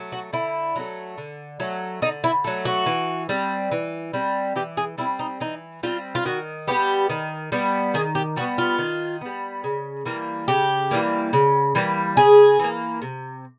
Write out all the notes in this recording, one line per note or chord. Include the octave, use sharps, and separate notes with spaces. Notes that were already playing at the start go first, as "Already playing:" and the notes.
Already playing: F#3 A3
F#4
D3 E4
F#3 A3
D3
F#3 A3
D3 D#4
E4
F#3 A3
F#4
E3
G3 C4
E3
G3 C4
E3 G4
G#4
G3 C4 E4
D#4
E3 D#4
G3 C4 F4
F4
D#3 F#4
G3 B3 G4
D#3
G3 B3
D#3 G#4
G4
G3 B3 F#4
F4
D#3
G3 B3
C#3
E3 G3 A#3
C#3 G4
E3 G3 A#3
C#3
E3 G3 A#3
C#3 G#4
E3 G3 A#3
C3